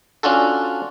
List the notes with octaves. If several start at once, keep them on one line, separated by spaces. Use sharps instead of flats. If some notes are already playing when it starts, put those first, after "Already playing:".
C#4 D4 F4 F#4 A4